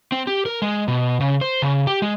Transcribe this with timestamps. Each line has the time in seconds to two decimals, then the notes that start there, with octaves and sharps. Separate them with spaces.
0.12 C4
0.27 G4
0.46 A#4
0.62 G#3
0.88 B2
1.20 C#3
1.41 C5
1.62 C#3
1.87 G4
2.02 G#3